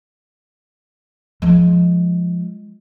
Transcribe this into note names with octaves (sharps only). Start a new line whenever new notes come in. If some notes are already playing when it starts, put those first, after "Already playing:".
F3 G#3